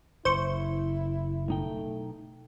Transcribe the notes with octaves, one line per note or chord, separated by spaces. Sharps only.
F#1 E4 C5 C#6
B1 A3 D#4 G5